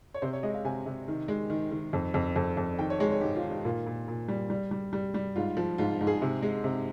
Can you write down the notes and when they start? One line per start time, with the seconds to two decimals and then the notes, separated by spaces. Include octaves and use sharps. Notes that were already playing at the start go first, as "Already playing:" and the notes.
0.14 C#5
0.22 C3 C5
0.33 C#5
0.43 G#3 D#5
0.54 F5
0.64 C3 G#5
0.86 C3
1.08 D#3
1.28 G#3
1.50 D#3
1.71 D#3
1.93 F2
2.14 F2
2.36 F2
2.57 F2
2.79 D#3 G5
2.90 C#5
3.00 G#3 C#5
3.12 C#5
3.21 G#2 G4
3.36 F4
3.43 D#3
3.51 D#4
3.65 A#2 F4
3.86 A#2
4.08 A#2
4.28 G3
4.50 G3
4.71 G3
4.93 G3
5.14 G3
5.36 G#2 F4
5.57 F3
5.78 G#2 F4
6.01 G#2
6.07 G#4
6.22 C3
6.43 G#3
6.64 C3